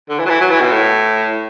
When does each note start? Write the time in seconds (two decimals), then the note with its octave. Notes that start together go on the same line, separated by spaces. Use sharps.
0.09 D3
0.19 E3
0.25 F#3
0.29 E3
0.41 F#3
0.51 E3
0.61 B2
0.72 A2